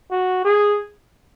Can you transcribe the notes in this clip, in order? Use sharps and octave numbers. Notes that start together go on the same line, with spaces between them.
F#4
G#4